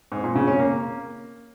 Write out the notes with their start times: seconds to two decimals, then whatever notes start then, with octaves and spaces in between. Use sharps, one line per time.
0.12 G#2
0.24 A#2
0.35 C#3
0.47 C#4
0.59 A#3